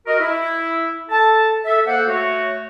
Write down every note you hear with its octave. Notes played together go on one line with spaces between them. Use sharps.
F#4 A#4 D#5
E4
A4 A5
A4 E5
A#3 A4 C5 F#5
A3 F#4 C#5